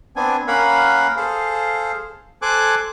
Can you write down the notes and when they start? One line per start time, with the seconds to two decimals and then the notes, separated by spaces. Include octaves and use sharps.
0.16 B3 C4 D4 G#5
0.47 A#3 C#4 A#4 F5 F#5 B5
1.17 G#4 A4 C5 F5
2.42 A4 C5 G#5 D6 F#6